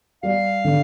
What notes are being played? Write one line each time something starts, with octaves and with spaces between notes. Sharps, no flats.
G3 F5
D3